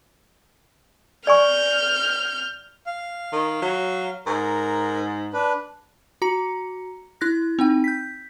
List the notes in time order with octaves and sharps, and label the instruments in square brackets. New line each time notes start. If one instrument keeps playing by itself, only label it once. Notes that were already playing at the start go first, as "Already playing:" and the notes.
[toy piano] D5 G#5 C#6 [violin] F6 G6
[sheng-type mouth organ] F5
[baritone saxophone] D#3
F#3
[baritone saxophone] G#2 [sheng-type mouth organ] A#4
[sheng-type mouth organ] D4 B4
[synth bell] F#4 A#5 C#7
E4 F#6 A#6
C4 D#4 G5
G6 B6